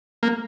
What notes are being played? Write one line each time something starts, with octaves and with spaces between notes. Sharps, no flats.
A#3